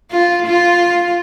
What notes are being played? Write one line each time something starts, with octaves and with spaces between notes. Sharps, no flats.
F4
F4